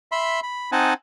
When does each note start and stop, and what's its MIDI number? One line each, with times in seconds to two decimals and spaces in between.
0.12 0.40 76
0.12 0.40 83
0.12 0.40 84
0.43 0.71 83
0.72 0.94 60
0.72 0.94 63
0.72 0.94 75
0.72 0.94 78
0.72 0.94 80
0.72 0.94 81